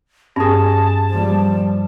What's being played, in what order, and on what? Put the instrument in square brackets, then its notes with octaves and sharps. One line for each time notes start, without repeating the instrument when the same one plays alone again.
[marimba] G2 [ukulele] C#4 G#4 [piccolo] A5
[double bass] F3 G3